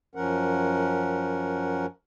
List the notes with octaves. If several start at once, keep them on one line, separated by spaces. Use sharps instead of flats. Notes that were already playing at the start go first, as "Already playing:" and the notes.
F#2 F3 C#4 A#4 F#5